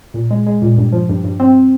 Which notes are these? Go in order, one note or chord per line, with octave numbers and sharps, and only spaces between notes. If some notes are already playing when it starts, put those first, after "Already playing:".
A#2
G#3
G#3
A#2
G2
F3
G2
G2
C4